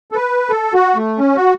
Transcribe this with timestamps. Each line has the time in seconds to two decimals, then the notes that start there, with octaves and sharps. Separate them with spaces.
0.12 A4
0.15 B4
0.49 A4
0.74 F#4
0.96 A3
1.18 C#4
1.36 F#4